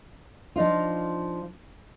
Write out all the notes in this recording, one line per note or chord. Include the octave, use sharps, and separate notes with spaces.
F3 D4 D#4 F4